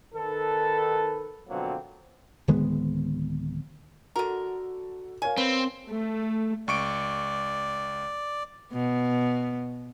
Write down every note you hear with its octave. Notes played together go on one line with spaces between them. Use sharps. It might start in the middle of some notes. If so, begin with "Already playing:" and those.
D#3 A4 B4
B2 D3 F3 F#3 A#3 C4
D1 D#3 G#3 B3
D3 F#4 A4 A#4
A#4 C#5 F5 G#5
C4 B4
A3
C#2 D5 C#6 D7
B2 B3